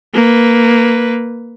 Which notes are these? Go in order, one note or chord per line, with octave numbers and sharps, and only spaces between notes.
A#3 B4